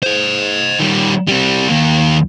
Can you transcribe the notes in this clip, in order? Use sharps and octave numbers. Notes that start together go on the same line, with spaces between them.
C5 D#5
D#3 G3
G3 C4
D#2 A#3